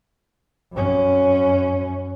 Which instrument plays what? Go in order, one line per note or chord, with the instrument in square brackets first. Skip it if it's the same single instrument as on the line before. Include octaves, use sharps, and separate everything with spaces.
[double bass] F#2 C#4